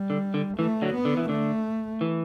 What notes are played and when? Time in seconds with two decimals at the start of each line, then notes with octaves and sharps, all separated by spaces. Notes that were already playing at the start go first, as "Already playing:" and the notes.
Already playing: G3
0.10 D3
0.34 D3
0.58 E3 A3
0.82 D3 F#3
0.94 B3
1.05 D3
1.17 E3
1.29 D3 A3
2.01 E3